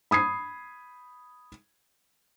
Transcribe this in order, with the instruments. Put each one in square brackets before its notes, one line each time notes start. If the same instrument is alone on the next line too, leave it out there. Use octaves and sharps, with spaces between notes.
[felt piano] B5 D#6 G#6 C7